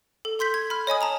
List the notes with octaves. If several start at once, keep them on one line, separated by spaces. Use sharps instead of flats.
A4
A4 C6 G6 B6
G#6
B5 F6
C#5 D#5 G#5 D#6
A5 A#5 D#6